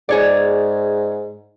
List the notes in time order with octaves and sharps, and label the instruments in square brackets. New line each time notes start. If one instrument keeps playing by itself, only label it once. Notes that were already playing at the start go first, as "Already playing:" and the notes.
[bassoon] G#2 [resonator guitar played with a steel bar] G#4 C#5 D5